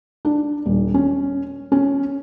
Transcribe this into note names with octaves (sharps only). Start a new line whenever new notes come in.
D4
D#1
C#4
C#4